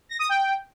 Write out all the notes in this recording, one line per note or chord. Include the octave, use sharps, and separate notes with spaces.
A#6
D#6
G5